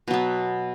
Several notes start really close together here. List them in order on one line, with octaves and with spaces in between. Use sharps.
B2 F#3 B3